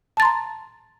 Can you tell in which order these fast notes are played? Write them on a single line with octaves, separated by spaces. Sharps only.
A5 A6 C6 A#5